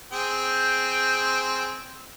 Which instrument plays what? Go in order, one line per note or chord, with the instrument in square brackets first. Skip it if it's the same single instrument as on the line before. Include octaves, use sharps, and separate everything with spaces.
[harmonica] C4 G#4 G5